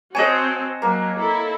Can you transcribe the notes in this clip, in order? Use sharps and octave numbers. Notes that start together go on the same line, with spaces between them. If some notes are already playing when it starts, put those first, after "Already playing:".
C4 F#4 C#5 D#5 G#5 A5
F#3 A#3
E4 A4